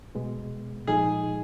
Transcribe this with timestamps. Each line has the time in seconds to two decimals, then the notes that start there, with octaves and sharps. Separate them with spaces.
0.15 B2 G#3 B3
0.87 A#2 F3 G#3 D#4 G#4